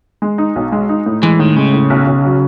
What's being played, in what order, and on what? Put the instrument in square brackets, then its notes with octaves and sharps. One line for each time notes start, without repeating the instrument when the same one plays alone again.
[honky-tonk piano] G#3
D#4
B1
G#3
D#4
A2
[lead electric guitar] E3 [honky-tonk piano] G#3
[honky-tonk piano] A2 [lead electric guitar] D#3
[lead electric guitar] C#3 [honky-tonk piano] G#3
[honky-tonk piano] A2
B1
B1
F#3